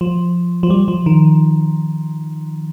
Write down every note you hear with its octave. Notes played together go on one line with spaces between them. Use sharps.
F3
F3
G3
F3
D#3